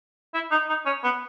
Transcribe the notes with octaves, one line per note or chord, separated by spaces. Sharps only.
E4
D#4
D#4
C#4
B3